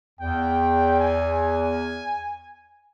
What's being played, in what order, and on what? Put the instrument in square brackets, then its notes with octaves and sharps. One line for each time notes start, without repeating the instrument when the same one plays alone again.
[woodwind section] E2 [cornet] G5
[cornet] G#5